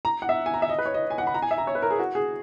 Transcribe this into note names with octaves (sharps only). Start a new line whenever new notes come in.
A#5
F#5
E5
G#5
A#5
E5
D#5
B4
C#5
D#5
G#5
F#5
B5
A#5
G#5
E5
A#5
C#5
B4
A#4
G#4
F#4
G#4